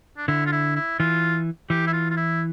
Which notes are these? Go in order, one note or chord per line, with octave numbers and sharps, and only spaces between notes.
D4
D3 E4
F4
E4
E4
E3 F4
E3 G4
E4
F4
F4
E4